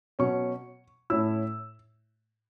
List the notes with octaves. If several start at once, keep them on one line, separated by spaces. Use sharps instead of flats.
B2 F#3 C#4 C#6
A2 A3 C#4 E4 E6